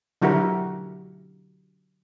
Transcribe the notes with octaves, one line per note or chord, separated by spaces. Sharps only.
D3 F#3 E4 F#4 G4 A#4